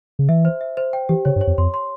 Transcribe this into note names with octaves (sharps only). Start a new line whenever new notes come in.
C#3
E3 E5
C5
E5
C5
G5
E3 G4
C#3 C#5
G2
C#5
F2
F2 C6
C6